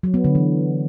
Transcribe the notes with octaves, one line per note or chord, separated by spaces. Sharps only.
F#3
B3
D3
E3